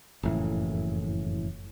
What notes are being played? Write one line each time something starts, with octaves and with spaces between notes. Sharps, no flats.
F#1 F2 A2 E3